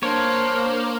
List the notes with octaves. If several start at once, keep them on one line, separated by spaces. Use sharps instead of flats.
A#3 D4 C5 C#5